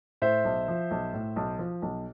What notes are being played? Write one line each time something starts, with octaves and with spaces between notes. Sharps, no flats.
A2 C5 E5
B1
F3
B1
A2
B1
F3
B1